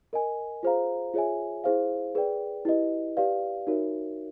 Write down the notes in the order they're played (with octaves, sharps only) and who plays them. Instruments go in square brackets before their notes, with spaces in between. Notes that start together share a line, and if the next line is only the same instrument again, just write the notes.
[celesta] A#4 D#5 G#5
F4 G#4 C5 F5 A#5
F4 G#4 C#5 E5 G#5
E4 G#4 C5 F5
G#4 B4 D5 G5
E4 G4 B4 D#5
G4 B4 D5 F5
D#4 F#4 A#4 C#5 E5